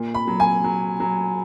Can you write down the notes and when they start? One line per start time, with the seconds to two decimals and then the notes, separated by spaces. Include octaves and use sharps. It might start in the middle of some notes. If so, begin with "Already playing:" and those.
Already playing: A#2
0.14 B5
0.27 F#3
0.40 G#5
0.64 F#3
1.00 F#3